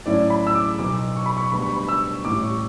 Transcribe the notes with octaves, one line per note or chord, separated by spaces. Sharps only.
A2 F#3 C#4 E4 D5
B5
E6
D6
B1 B2 F#3 D6
C#6
B5
C#6
D2 D3 G3 B3 B5
C#6
B5
E6
A1 A2 G3 D6
C#6